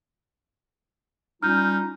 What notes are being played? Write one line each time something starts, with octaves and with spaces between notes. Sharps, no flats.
G3 C#4 D#4 F4 F6 G6